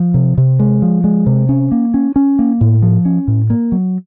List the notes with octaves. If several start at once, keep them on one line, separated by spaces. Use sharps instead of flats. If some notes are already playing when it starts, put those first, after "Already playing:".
Already playing: F3
C3
C3
G#3
F3
G#3
C3
C#4
A#3
C#4
C#4
A#3
A2
F3
C#4
A2
A#3
F#3